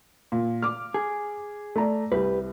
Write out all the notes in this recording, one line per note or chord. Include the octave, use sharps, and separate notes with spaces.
A#2
D6 F6
G#4
A3 D5 A#5
C2 G4 B4